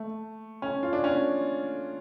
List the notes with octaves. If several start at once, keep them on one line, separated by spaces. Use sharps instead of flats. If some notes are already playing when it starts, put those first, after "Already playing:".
Already playing: A3
C#4
F4
D4
C#4